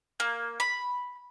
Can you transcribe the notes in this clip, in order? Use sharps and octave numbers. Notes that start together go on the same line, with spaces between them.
A#3
B5